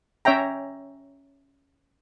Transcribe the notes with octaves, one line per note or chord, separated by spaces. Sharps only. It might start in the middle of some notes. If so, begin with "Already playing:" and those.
C#4 C#5 E5 G5 A#5